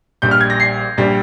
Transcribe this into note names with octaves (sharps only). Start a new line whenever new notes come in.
A#1 A#2 G3 G6
F6
G#6
A#6
C7
A#1 A#2 G3